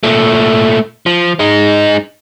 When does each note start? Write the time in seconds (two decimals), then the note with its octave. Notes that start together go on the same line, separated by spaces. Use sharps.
0.03 A#2 A3
1.06 F3
1.39 G#3 D#4